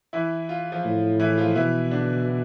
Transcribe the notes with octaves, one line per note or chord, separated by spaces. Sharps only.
E3 E4
F4
F3 F4
A2
E3 E4
F3 F4
B2 E3 E4
D3 D4